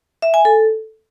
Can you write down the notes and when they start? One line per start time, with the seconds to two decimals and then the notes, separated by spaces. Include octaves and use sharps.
0.22 E5
0.34 G#5
0.45 A4